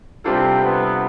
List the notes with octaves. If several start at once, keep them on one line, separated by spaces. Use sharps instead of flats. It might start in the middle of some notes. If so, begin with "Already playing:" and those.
C3 G3 C4 D4 F4 A4
B3